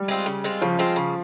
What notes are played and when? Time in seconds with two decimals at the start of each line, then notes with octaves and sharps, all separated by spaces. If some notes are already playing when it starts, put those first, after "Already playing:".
Already playing: G3
0.08 G#3 C4 F4
0.26 C#3
0.44 G#3 C4 F4
0.61 C#3 F3
0.79 G#3 C4 F4
0.96 C#3